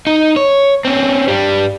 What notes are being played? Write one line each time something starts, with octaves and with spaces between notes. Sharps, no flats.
D#4
C#5
C4 C#4
G2 G3